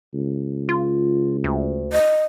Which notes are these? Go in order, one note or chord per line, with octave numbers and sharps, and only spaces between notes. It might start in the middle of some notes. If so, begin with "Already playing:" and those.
C#2
F4
D2
D#5